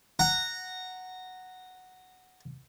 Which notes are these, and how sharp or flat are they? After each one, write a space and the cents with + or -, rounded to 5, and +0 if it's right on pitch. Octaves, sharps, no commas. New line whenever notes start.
F#5 +0 A#5 -15